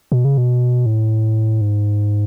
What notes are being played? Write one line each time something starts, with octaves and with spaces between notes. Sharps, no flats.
B2
C#3
B2
A2
G#2